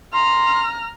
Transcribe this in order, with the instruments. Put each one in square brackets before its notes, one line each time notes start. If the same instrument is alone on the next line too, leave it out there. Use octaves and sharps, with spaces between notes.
[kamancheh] A#5 F6 [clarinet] C6